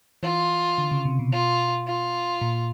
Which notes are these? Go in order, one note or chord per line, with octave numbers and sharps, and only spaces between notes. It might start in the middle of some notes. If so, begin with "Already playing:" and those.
E3 F4
D3
C#3
C3
B2
F4
F4
A#2